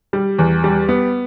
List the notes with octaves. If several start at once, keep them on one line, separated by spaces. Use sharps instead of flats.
G3
E2
G3
B3